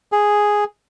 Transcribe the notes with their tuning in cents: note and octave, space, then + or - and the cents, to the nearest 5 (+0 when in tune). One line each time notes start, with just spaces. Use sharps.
G#4 +0